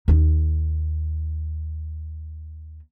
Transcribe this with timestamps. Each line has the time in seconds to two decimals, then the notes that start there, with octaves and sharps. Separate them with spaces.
0.08 D#2 D#4